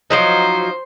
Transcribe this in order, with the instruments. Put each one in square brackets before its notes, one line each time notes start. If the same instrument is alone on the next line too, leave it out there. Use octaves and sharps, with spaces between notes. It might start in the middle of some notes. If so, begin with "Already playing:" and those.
[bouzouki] F3 F#3 D#4 [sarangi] C5